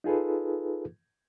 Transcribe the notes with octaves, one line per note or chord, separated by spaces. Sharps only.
D#4 F4 G#4 A4 B4